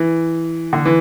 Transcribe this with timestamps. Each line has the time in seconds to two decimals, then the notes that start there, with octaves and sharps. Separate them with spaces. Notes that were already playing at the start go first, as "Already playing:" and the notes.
Already playing: E3
0.73 D3
0.85 E3